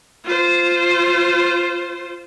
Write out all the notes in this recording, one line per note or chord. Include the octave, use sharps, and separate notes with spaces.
F4 C5